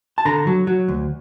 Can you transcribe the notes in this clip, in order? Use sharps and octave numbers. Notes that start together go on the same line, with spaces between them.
A5
D3 A#5
F#3
F#3
D2